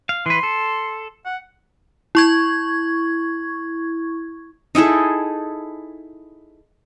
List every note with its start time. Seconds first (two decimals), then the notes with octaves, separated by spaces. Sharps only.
0.09 F5
0.26 E3 B4 C6
0.43 A4
1.26 F#5
2.15 E4 C#6 G#6
4.75 D#4 E4 G#4 A4